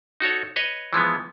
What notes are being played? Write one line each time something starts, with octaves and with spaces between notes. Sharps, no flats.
D#4 F#4 A4 C#5
B4 C#5 D#5
E3 F3 G#3 B3